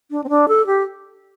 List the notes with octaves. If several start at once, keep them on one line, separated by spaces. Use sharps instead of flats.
D4
C4
D4
A4
G4